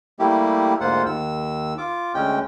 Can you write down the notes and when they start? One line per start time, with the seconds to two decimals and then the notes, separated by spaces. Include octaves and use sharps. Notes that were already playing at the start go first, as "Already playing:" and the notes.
0.19 G3 A3 A#3 E4 G4
0.81 D2 G#2 A#3 F4 C5 F#5
1.06 D#2 E6
1.78 F4 D6
2.14 D2 G#3 C#4 G5